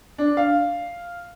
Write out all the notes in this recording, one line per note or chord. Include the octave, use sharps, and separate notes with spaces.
D4
F5